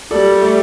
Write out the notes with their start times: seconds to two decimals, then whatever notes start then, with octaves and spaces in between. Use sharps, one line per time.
0.11 G3 A4 D5
0.41 A3